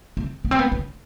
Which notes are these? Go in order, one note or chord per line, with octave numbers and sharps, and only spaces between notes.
C4
B3
C4
B3
C#4